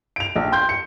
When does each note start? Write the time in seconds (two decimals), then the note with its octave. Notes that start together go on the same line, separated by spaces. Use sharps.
0.16 D7 F7
0.36 A#1
0.52 G5 C6 G6
0.69 C#7